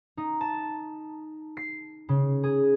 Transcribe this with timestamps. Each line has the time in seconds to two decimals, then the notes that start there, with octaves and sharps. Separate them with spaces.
0.17 D#4
0.41 A5
1.57 C7
2.09 C#3
2.43 G#4